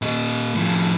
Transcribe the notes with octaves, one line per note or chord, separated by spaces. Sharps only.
A#2 D#5
A2 F3